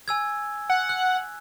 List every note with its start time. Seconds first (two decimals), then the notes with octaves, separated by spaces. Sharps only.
0.08 G#5 E6 G#6
0.70 F#5
0.89 F#6